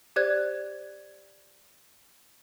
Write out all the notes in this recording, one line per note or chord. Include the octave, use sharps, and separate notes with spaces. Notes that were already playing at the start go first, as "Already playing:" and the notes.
G4 C5 D5 F#6 G#6